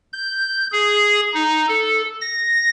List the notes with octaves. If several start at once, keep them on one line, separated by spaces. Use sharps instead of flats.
G6
G#4
D#4
A4
A#6